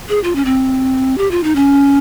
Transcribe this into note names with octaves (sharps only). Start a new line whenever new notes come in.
G#4
F4
C#4
C4
G4
F4
D#4
C#4